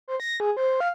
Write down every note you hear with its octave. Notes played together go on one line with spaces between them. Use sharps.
C5
A#6
G#4
C5
F5